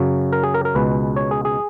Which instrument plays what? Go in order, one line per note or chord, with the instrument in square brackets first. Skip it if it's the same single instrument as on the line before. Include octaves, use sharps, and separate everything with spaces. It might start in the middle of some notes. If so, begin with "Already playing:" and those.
Already playing: [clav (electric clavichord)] F#2 C#3 F#3
A#4
G#4
A#4
A#4
C#2 B2 G#3 B4
C#5
G#4
G#4